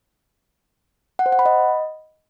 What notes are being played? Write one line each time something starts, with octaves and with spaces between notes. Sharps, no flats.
F#5
C5
F#5
B5
D#5